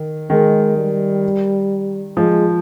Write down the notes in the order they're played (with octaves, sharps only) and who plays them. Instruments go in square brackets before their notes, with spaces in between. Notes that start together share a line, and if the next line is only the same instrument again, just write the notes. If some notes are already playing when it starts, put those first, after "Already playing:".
Already playing: [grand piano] D#3
[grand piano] D#3 [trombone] G#3
[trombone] G3
[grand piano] F3 [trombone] G#3